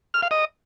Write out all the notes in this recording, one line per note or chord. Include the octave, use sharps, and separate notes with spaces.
F6
F5
D#5